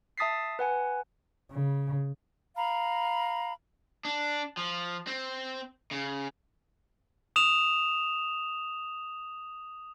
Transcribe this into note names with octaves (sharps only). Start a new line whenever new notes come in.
E5 A5 D#6 A6 B6 C7
B4 F#5 G#5
C#3
F5 A#5 B5
D4
F3
C4
C#3
D#6 E7 F7